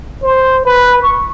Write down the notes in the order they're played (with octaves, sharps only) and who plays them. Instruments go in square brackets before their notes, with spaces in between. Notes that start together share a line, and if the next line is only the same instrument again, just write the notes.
[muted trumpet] C5
B4
C#6